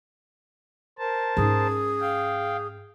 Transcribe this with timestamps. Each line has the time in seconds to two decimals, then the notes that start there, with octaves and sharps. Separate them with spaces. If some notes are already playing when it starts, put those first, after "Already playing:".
0.98 A#4 C5 A5
1.37 G#2 C#4 G#4
2.01 F5 G5